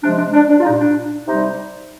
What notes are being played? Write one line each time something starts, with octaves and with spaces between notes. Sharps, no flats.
C3 F3 G#3 D4
D4
D4
D4
F4
A#2 G3 D#4
D4
C3 G3 D#4